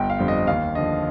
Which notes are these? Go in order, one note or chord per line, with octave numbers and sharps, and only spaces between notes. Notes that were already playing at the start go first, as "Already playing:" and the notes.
Already playing: G1 G5
F5
F2 D3 G3 C4
D#5
D#2 F5
D3 F3 D#5